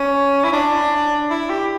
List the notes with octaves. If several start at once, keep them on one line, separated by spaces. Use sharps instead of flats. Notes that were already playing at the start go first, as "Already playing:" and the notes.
Already playing: C#4
E4
D4
E4
G4